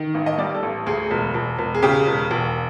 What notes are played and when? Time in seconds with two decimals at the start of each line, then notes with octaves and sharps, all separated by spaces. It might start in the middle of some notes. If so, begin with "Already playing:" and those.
Already playing: D#3
0.14 A1
0.26 D#5
0.38 G3 D5
0.55 A4
0.63 A1
0.87 D2 G#4
1.11 E1
1.34 E1
1.58 E1
1.75 G#4
1.83 C#3 G4
2.07 E1
2.31 E1